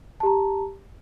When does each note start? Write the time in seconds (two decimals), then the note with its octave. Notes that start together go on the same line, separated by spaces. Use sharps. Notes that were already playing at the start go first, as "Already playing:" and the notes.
0.20 A5
0.23 G4
0.26 A#5